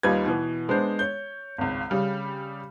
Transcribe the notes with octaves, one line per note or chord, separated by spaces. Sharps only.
D#2 G3 D#4 F4 B4 G#6
B2 E3 B3
G#3 B3 D4 C5
C#5 G6
G#1 C#2
C#3 G3 F6